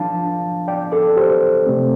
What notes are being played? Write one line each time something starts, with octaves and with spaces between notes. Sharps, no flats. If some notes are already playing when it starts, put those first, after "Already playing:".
Already playing: F3 D4 F5 A5
D5 G5
A4 D5
G4 C5
C3 A3 C4